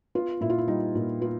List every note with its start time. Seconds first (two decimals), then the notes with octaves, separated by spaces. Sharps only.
0.15 B3 F4
0.41 A#2 E4
0.50 F4
0.58 E4
0.68 G3 D#4
0.95 A#2
1.21 B3 F4